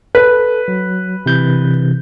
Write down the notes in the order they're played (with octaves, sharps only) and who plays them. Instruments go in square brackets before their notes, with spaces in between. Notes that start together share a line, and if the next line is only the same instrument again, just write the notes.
[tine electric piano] A4 [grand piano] B4
[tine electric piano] F#3
C3 E3 G6